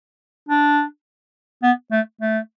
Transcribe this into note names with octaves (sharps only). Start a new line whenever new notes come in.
D4
B3
A3
A3